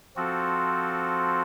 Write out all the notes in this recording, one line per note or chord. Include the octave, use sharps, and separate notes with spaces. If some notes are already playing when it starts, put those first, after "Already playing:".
F3 C4 F#4 A4